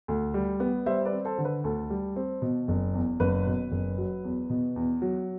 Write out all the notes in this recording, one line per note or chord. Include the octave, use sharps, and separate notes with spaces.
D2
G3
B3
G3 C5 E5
B4 D5
C4
A4 C5
D3
B4
D2 A4
G3
C4
B2
F#1
E2
F#1 B4
B2
F#1
F#3
E2
B2
E2
F#3